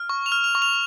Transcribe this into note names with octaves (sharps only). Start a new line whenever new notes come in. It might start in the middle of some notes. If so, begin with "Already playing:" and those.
Already playing: F6
C#6
F7
F6
F7
C#6
F7